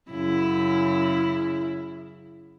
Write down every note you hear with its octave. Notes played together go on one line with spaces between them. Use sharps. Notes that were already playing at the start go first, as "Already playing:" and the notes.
F#2 C#3 E4